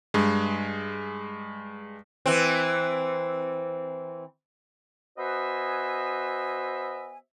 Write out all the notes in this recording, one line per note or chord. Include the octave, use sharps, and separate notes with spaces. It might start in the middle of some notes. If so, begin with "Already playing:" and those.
G2 G#3
E3 C4
B3 F#4 C5 D#5 E5 G#5